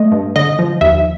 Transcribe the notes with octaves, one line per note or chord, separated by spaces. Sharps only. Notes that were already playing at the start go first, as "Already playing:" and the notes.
Already playing: A3 D#5
G2
D3 D#5
F3
D#2 E5